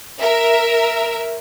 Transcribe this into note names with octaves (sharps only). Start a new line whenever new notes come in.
A#4 E5